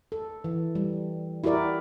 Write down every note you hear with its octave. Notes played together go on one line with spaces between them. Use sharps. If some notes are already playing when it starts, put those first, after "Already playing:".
A4
E3
G3
E4 F#4 G4 A#4 D5